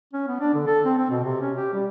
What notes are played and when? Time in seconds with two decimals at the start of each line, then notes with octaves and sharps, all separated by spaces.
0.13 C#4
0.28 B3
0.41 D4
0.55 D3
0.67 A4
0.85 C4
0.98 C4
1.11 B2
1.24 C3
1.41 C#4
1.57 G4
1.74 G3